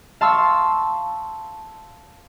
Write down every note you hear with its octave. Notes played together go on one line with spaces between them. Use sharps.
F5 A5 C6 C#6 E6